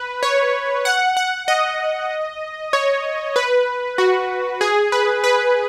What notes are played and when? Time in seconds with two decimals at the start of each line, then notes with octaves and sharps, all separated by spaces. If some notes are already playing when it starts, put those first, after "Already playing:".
Already playing: B4
0.23 C#5
0.85 F#5
1.17 F#5
1.48 D#5
2.73 C#5
3.36 B4
3.98 F#4
4.61 G#4
4.92 B4
5.24 B4